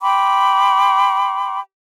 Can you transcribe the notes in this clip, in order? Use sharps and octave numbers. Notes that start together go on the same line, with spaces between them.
G5 B5 C6 D6